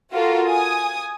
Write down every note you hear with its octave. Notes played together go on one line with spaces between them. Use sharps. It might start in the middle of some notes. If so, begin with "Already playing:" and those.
F4 F#4 A4 A#4
G#5 D#6